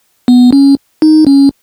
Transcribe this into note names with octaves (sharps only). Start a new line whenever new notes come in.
B3
C#4
D#4
C#4